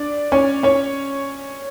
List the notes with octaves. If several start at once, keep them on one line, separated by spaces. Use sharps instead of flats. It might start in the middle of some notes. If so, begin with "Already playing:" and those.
Already playing: D4 D5
C#4 C#5
C#4 C#5